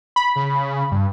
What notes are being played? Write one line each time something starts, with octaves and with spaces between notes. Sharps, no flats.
B5
C#3
G2